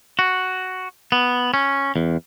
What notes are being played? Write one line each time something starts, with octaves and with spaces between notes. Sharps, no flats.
F#4
B3
C#4
E2